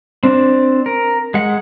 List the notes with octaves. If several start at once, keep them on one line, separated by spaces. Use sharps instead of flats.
C4 D4
A#4
G#3 F#5